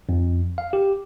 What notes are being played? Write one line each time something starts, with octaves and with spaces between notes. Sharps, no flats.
F2
F5
G4